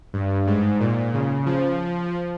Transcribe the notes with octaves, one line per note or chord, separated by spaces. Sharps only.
G2
G#2
A#2
C#3
F3